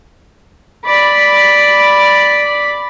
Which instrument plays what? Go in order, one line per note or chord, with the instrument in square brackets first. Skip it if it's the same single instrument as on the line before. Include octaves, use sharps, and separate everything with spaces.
[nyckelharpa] D5 B5